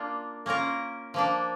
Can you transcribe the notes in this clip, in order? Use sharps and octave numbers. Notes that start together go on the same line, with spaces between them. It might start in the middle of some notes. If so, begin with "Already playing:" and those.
Already playing: A#3 D4 F4
A#3 C#4 F4 A#4
F3 A#3 D4